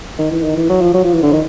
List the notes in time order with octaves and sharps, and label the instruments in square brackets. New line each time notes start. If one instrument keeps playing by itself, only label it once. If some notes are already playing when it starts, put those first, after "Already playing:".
[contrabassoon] D#3
E3
D#3
E3
F#3
F3
F#3
F3
E3
D3
D#3